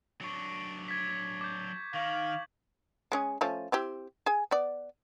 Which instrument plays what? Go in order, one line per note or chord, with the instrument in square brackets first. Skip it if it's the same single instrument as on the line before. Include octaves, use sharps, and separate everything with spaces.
[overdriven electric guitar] F#3 D4 [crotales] C#6 C#7
[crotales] G#6 A6 B6
D6 G6
[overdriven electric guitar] D#3 [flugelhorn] F5 [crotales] C#6 F#7
[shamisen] G#3 C#4 G#4
F3 A3 C#4
C4 E4 G4
G#4 G#5
B3 D5